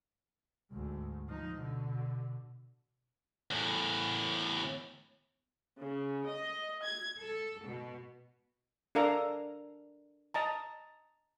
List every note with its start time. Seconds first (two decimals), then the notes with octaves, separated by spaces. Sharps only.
0.71 D2 G#2
1.28 F3 D#4
1.58 B2 D3
3.51 E2 A2
5.80 C#3
6.29 D#5
6.83 G#6
7.19 A4
7.66 B2
8.95 D4 A4 A#4 F5 A#5
10.34 D#5 A5 A#5